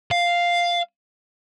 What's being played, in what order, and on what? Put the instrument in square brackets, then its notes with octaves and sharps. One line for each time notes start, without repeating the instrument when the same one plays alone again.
[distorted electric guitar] F5